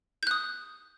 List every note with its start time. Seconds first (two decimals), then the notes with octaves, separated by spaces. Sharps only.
0.23 G6
0.27 F#6
0.31 D#6